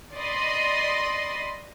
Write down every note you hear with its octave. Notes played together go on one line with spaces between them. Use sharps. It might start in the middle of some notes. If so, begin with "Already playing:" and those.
D5 D#5 B5 C6 D#6